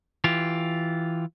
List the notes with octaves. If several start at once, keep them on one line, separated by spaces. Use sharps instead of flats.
E3 F4 G4